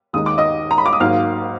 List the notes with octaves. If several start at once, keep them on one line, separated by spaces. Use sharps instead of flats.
D#2 D#3 G#3 D#4 D#6
D6
D#5 D#6
A#5
B5
D6
D#6
G#1 G#2 F#3 A#3 F5 F6